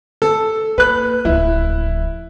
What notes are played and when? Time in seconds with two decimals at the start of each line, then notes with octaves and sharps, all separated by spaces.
0.22 A4
0.78 A#3 B4 F#6
1.25 D1 F3 E4